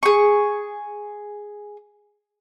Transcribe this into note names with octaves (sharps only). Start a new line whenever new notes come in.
G#4 C#6